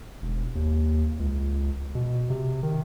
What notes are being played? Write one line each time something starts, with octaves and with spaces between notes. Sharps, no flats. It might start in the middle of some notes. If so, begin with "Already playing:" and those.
E1
D#2
C#2
B2
C3
D#3